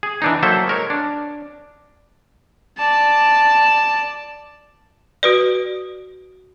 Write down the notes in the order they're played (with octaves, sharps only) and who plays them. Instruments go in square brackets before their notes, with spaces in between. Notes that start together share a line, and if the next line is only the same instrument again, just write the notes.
[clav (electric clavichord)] G#4
E3 D4 D#4
F#3 A#3 A4 C5 E5
G#3 A#4 C#5
D4
[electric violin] D5 A5
[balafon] F#4 B4 D5